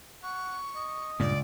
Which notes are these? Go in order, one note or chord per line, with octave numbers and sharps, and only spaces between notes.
F#5 C#6
D#5
C#2 G2 A#2 D5